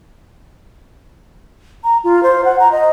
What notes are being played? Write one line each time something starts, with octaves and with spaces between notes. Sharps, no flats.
A#5
F4
C5
F#5
A#5
D#5